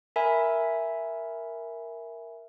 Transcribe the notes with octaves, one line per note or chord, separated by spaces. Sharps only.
A#4 E5 G#5 B5